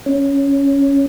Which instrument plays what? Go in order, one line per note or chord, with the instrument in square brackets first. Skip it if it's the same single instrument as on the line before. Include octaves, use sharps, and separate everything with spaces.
[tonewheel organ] C#4